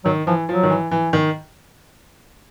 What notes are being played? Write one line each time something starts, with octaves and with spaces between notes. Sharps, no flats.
D#3 F#3
E3 F3
F3 F#3
D#3
E3
E3
D#3